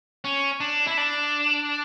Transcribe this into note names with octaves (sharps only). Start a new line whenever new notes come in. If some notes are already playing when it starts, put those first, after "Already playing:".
C#4
D4
E4
D4